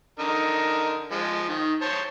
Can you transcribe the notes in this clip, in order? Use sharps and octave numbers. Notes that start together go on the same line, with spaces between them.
D3 D#4 A#4
F3 G#3
D#3
C5 C#5 A5